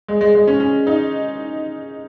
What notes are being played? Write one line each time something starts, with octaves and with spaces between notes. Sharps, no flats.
G#3
G#3
G#3
C#4
C#4
D#4